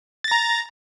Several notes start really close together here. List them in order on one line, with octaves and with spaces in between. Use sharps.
A6 A#6 A#5